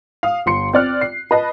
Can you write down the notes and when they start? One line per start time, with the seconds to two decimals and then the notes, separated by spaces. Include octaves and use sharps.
0.23 F5 D#6
0.46 G1 C6 C#7
0.73 C4 D5 F6 F#6
1.01 C7
1.31 B4 D#5 A5